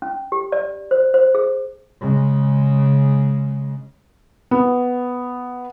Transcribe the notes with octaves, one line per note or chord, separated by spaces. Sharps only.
C#4
G4
D5
C5
C5
G#4
C#3 G#3
B3